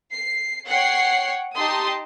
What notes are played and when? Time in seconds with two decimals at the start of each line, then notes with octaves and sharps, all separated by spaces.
0.14 C7
0.69 C#5 F#5 G5 C7
1.55 D#4 G4 A5 C6 D#6